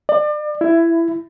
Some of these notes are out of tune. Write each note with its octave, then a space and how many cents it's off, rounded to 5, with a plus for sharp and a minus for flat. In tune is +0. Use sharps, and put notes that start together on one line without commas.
D5 +35
E4 +15